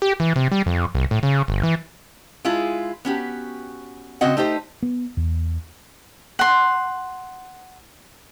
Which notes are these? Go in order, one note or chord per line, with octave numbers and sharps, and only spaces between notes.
G4
E3
C3
G3
F2
C2
A2
C#3
G1
E3
G#3 E4 F4 G#4
B3 C#4 F#4 G4
C#3 C4 F#4 D#5 F#5
A3 D#4 G4 C5
B3
E2
F#5 C6